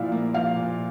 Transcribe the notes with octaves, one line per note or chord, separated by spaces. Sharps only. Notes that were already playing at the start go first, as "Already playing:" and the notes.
Already playing: A#2 F3 E4 D5 F5
A#3
F3 F5
A#2